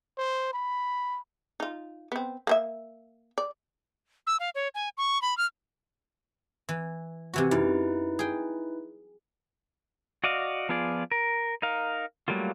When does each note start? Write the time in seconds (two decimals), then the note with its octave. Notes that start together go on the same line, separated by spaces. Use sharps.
0.17 C5
0.53 B5
1.60 D#4 F4
2.12 B3 C4
2.47 A#3 C5 E5
3.38 D5
4.27 E6
4.40 F5
4.55 C#5
4.75 G#5
4.98 C#6
5.22 B5
5.38 F6
6.69 E3
7.34 C3 E3 F#4
7.51 F#2 D#4 E4 B4
8.19 G#4 G5
10.24 F#4 D5 D#5 F5
10.69 F3 B3 F4 G#4 D5
11.12 A#4
11.62 D#4 A#4 F5
12.28 F#3 G3 A3 A#3 F4